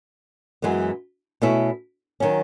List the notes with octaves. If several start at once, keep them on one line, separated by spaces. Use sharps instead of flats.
F#2 E3 G#3 B3
B2 A3 C#4 E4
D#3 F#3 C#4